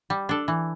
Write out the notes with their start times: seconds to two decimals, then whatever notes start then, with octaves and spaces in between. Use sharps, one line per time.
0.10 G3
0.29 D4 A4
0.48 E3